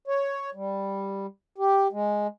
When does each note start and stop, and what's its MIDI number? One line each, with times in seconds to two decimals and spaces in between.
0.08 0.50 73
0.54 1.26 55
1.58 1.88 67
1.92 2.27 56